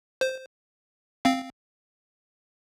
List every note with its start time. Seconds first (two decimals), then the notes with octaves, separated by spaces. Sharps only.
0.21 C5
1.25 C4 F5